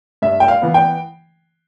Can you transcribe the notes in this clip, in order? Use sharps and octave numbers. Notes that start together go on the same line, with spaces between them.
G2 E5
G5
F5
E3 B3
G5